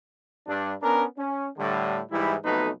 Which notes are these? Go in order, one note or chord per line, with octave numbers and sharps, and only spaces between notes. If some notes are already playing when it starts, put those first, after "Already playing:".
G2 D4
B3 C#4 D4 A#4
C#4
A2 D3 G3
G#2 E3 G3 E4
B1 F2 B2 A3 D#4 B4